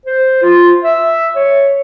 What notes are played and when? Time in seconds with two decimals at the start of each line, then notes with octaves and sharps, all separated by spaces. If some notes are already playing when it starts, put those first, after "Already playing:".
0.06 C5
0.43 F4
0.83 E5
1.36 C#5